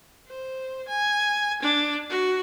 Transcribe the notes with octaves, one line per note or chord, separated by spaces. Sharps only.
C5
G#5
D4
F#4